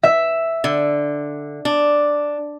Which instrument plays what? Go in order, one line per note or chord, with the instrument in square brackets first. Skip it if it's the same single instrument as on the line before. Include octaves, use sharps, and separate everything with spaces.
[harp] E5
[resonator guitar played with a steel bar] D3
D4